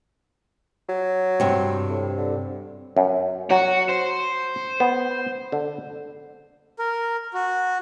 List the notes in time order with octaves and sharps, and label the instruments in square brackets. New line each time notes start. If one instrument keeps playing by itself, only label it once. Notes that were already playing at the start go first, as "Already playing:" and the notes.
[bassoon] F#3
[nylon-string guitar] G2 C3
[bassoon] A2
D3
[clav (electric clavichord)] F#2
[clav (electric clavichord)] F#3 [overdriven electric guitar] F#4
[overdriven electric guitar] C5
[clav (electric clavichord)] B3
D3
[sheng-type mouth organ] A#4
F#4